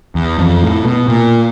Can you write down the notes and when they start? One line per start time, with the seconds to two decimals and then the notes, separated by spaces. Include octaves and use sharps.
0.15 E2
0.39 F2
0.62 A2
0.85 B2
1.08 A#2